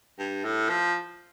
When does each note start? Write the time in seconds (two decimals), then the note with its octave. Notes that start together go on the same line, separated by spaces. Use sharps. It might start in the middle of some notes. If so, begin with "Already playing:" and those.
0.19 G2
0.44 A2
0.69 F3